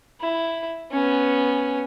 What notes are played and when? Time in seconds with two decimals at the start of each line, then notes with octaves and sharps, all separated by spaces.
0.21 E4
0.92 B3 C#4